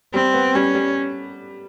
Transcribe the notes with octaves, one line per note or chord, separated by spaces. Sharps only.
G3 C4
B3
G3 C#4
G3